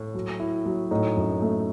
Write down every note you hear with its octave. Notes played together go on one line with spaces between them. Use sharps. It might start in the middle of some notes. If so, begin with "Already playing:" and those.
Already playing: A2
F#3
E4
F#3
A2 D#4
F#2
A3